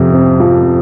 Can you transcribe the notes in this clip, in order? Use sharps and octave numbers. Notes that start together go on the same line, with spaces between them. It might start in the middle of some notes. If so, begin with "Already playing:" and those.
Already playing: F2 C3
C4
F3